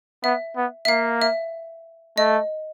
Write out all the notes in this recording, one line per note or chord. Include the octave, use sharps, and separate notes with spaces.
B3 E5
B3
E5
A#3 F5
E5
A3 D#5